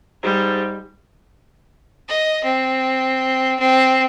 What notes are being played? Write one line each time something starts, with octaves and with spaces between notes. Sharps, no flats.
G#2 G3
D#5
C4
C4